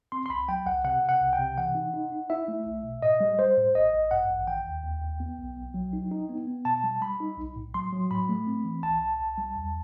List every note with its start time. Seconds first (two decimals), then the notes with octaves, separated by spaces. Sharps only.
0.12 C4 C6
0.26 C6
0.30 C2 B5
0.48 F#3 G5
0.66 C2 F#5
0.85 C3 F#5
1.03 C3
1.09 F#5
1.21 C2
1.33 G5
1.39 C3
1.57 E3 F#5
1.75 D#4
1.94 D#4
2.12 D#4
2.30 E4 E5
2.48 A3
2.66 B1
2.84 B2
3.02 A2 D#5
3.20 G3
3.39 G3 C5
3.57 A2
3.75 A1 D#5
3.93 A1
4.11 G2 F#5
4.30 A1
4.47 D#3 G5
4.66 D#2
4.84 D#2
5.02 D#2
5.20 B3
5.38 B1
5.57 B1
5.74 F#3
5.93 D#4
6.11 D#4
6.29 B3
6.47 B3
6.65 B2 A5
6.84 G3
7.01 G3 B5
7.20 D#4
7.38 B1
7.56 A2
7.74 F#3 C6
7.92 F#3
8.10 A2 B5
8.29 A3
8.47 C4
8.65 E3
8.83 C2 A5
9.01 C2
9.19 C2
9.38 G3
9.56 E2